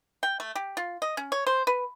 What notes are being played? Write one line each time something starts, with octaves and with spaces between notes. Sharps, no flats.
G5
A3
G4
F4
D#5
C#4
C#5
C5
B4